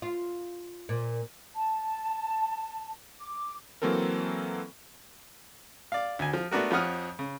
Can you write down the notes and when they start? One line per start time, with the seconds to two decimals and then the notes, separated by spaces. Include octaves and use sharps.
0.02 F4
0.89 A#2
1.54 A5
3.20 D6
3.82 E3 F#3 A#3 C4 A4 A#4
5.92 D5 F5
6.19 D2 G#5
6.33 F3
6.51 A3 B3 D4 F#4 A#4
6.71 F2 F3 C#5 F#5 D#6 F6
7.19 C#3